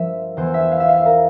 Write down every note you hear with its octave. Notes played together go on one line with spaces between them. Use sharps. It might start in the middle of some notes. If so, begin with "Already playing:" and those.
Already playing: G2 F3 A#4 C5 E5
E2 E3 C5
E5
F5
E5
F5
E5
A#4